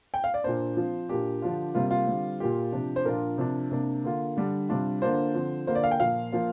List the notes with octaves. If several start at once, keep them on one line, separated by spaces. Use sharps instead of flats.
G5
F5
D5
A#2 A#3 D4 C5
F3 C4 F4
A#2 A#3 D4 G4
D3 F3 D4 F4
C3 G3 A#3 F4
F4
D3 G3 C4
A#2 A#3 F4 G4
C3 F3 D4
C5
A#2 F3 D4 F4 A#4
C3 F3 D4
C3 A#3 D4
D3 A#3 F4
D3 G3 D4
C3 G3 D4 F4
D3 A#3 D4 F4 C5
D3 F3 C4
D3 A#3 F4 C5
D5
F5
G5
A#2 F3 A#3 F5
F3 A#3 F4